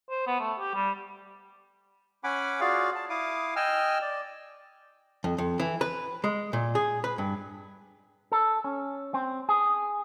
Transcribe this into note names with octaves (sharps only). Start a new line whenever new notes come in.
C5
B3
A3
G4
G3
C#4 F#5 G#5 B5 D6
F4 F#4 G#4 D5 F5
A5
E4 F5 D6 D#6
D#5 G5 G#5 E6 F6
D5
F2
F2
E3
B4
G#3
A#2
G#4
B4
G2
A4
C#4
C4
G#4